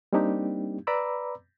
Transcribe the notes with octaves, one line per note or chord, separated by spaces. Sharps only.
G3 A#3 C4 D4 D#4 G4
B4 D5 A#5 B5 D6 E6